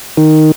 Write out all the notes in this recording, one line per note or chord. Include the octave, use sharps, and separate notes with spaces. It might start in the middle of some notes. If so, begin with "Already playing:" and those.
D#3